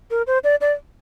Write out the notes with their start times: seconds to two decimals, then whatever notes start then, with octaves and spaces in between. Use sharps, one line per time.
0.11 A#4
0.27 C5
0.44 D5
0.61 D5